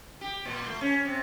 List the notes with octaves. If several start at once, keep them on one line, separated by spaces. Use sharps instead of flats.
G4
A#2
A3
C#4
C3